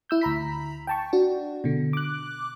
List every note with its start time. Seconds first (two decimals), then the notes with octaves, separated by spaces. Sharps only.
0.10 E4 E6 G6
0.21 D2 A#5 B5 B6
0.87 G5 A5 C#6
1.13 D4 F#4
1.64 B2 D3
1.93 D6 F#6